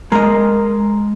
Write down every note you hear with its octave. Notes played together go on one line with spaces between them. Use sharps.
G#3 A#4 D#5